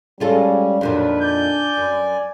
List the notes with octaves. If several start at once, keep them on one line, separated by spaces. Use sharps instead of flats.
G3 G#3 C#4 F4 A4
F2 A#2 D#3 F#3 D4 B4
D5 G#5 G6
F#2